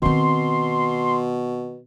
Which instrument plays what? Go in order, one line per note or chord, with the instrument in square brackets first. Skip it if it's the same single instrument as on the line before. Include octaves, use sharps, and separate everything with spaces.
[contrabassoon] B2 [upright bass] D#3 C4 [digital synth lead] C6